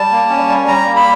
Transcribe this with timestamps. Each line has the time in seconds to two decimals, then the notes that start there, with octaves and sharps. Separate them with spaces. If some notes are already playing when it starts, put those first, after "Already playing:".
Already playing: G3 A5
0.11 A#3
0.30 C#4
0.49 G3
0.68 G3 A#5
0.86 A#3
0.96 B5